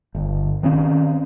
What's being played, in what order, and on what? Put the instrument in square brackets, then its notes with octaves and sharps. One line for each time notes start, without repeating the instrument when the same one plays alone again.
[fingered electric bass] G1
D#3 C4 C#4